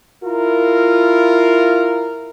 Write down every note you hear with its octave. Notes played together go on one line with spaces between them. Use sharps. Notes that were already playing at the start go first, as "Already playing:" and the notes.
E4 F4 A#4